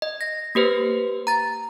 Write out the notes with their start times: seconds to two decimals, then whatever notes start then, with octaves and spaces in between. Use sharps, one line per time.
0.02 D#5
0.21 A#6
0.55 A#3 G4 B4 C5
1.27 A#5 A6